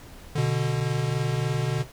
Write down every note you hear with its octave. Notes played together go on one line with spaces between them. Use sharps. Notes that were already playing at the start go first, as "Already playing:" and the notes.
B2 D3